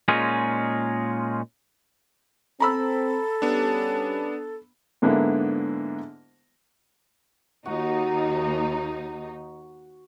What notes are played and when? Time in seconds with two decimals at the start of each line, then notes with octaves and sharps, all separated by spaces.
0.08 A#2 G#3 C#4 D#4 F4 G#4
2.60 C4 A4 A#5 B5 E6
3.42 G3 B3 C#4 D4 G4
5.02 G#2 D3 A#3 B3 D4 E4
7.66 D#2 D#4 F#4